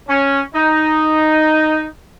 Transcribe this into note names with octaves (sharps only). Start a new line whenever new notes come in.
C#4
D#4